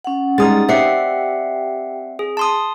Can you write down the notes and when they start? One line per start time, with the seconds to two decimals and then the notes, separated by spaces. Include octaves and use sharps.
0.04 C#4 F#5
0.38 G3 G#3 D#4 D#6 A6
0.69 C4 G4 D5 E5 F#5 G5 C7
2.19 G#4
2.37 A5 C6 D#6